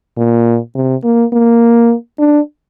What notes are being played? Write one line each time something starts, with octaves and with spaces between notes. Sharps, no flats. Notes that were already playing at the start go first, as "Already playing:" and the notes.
A#2
C3
A#3
A#3
D4